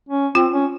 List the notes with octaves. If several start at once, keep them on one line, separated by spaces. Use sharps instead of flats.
C#4
C4 F4
C#4